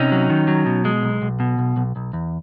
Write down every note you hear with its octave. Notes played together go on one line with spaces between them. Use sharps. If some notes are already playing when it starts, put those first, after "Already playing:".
Already playing: C3 C#4 D#4
F#3
D#3
F#3
B2
G#3
B1
B1
B2
B1
B1
B1
E2